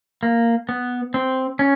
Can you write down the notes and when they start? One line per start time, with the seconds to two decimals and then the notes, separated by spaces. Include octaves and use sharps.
0.23 A#3
0.69 B3
1.14 C4
1.59 C#4